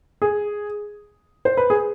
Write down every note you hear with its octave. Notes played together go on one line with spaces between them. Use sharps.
G#4
C5
B4
G#4